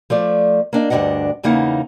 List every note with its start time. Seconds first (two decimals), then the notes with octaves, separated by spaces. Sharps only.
0.10 F3 A3 D5
0.73 A#3 D4 D#5
0.90 D2 G2 D#3 D4 D#5 F#5
1.43 E2 C#3 A#3 D#4 E4 F#5